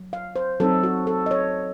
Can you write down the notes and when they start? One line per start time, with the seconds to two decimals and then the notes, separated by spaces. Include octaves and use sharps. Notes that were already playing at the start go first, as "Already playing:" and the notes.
Already playing: F#3
0.13 F5
0.36 C5
0.60 F#3 C4 D#4 A4
0.83 F#4
1.07 A4
1.26 D#5
1.31 C#5